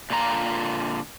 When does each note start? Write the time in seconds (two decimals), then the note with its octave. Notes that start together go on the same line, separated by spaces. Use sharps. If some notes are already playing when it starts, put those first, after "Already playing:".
0.10 A#2 D3 F4 A#5